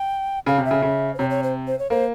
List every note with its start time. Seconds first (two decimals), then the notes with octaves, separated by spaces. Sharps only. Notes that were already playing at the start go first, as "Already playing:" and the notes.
Already playing: G5
0.46 C#3 F5
0.58 C3
0.65 E5
0.71 C#3
0.82 C#3
1.14 C5
1.18 C3 C#5
1.30 C#5
1.43 C5
1.67 C5
1.79 C#5
1.90 A#3 C5